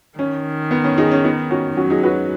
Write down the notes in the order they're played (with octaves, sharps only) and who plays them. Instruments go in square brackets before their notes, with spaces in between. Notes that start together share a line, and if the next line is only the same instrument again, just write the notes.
[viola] D#3 [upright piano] C#4
[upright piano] B3
C#4
D#4 G#4
C#4
B3 D#4
C#4 F#4
[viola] F#3 [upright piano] C#4 F#4
[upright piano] D#4 G#4
F#4 B4